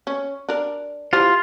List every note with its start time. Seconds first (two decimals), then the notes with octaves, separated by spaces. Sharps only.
0.07 C#4
0.49 D4 A#4
1.13 E3 F4 G4 C5